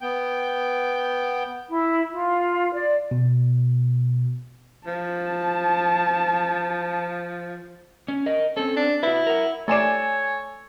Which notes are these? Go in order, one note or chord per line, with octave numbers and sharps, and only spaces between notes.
B3 G5
E4
F4
D5
B2
F3 A5
C#4
A#4 D#5
C4 C#4 A4
D4
E4 F#4 B4
A#4 F#5
A3 A4 C#5 D5 G#5 E7